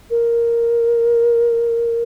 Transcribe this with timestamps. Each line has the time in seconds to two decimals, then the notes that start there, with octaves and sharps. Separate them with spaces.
0.10 A#4